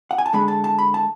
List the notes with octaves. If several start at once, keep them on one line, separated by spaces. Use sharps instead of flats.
F#5
G#5
A5
D3 G#3 D4 B5
A5
A5
B5
A5